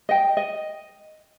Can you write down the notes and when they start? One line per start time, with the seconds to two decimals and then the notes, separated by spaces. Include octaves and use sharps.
0.09 D#5 G5
0.37 D#5